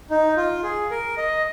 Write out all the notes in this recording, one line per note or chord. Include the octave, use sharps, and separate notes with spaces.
D#4
F4
G#4
A#4
D#5